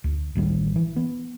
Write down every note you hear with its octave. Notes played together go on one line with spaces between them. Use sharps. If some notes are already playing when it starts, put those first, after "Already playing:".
D2
A1 D#3 G3
E3
B3